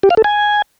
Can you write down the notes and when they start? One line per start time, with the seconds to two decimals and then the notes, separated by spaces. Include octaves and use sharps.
0.03 G4
0.10 F5
0.17 A4
0.24 G#5